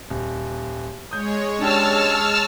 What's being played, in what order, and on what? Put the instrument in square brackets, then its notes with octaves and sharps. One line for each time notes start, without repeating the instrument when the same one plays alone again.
[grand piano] D#1
[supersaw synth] G#3 C#5 [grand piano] D#6 G6
[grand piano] C#4 D4 G4 [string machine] A5 E6 F6